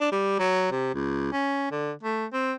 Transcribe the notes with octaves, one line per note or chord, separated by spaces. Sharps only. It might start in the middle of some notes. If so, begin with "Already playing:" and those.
D4
G3
F#3
C3
C#2
C#4
D3
A3
C4